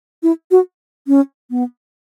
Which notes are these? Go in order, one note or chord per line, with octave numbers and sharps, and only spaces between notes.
E4
F#4
C#4
B3